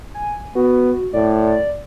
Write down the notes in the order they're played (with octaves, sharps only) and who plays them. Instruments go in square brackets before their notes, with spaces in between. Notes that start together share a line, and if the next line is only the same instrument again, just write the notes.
[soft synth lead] G#5
[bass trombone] B3 [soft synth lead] F#4
[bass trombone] A2 [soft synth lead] D5